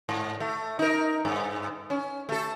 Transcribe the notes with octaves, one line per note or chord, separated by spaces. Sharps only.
G#2
A3
D#4 A#4
G2
C#4
A3 A4